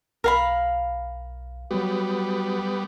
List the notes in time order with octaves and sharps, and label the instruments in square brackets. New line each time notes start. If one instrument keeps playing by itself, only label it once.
[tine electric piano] B1 [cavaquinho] A#4 F5 B5
[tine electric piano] F#3 F#4 [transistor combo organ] G3 B3